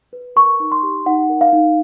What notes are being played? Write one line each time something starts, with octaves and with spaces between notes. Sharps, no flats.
B4
A#4 C#6
D#4
C6
G4
D#4 F#5
A#4
F5
D#4